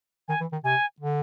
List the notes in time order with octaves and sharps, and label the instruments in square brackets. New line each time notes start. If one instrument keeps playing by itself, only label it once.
[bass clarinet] D#3 [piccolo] G#5
[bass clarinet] E3
D#3
[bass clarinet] C3 [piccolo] G#5
[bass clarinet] D3